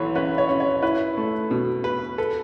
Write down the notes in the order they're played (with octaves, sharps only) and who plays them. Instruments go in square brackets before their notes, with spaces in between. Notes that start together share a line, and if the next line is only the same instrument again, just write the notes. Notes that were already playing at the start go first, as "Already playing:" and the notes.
Already playing: [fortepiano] B1 E3 [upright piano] A4 B4 C#5
[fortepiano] C#4 [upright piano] B4
[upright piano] C#5
[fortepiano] C#4
[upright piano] C#5
[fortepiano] E4 [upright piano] B4
[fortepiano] A3
B2
B4
[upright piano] A4 [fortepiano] B4